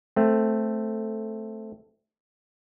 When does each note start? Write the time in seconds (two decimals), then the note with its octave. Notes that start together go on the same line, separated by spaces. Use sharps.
0.16 A3 C4